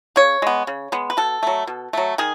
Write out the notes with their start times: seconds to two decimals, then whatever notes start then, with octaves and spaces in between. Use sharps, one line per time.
0.16 C#3 C#5
0.42 G#3 B3
0.67 C#3
0.92 G#3 B3
1.10 B4
1.17 B2 A4
1.43 F#3 A3
1.67 B2
1.93 F#3 A3
2.18 D#3 G#4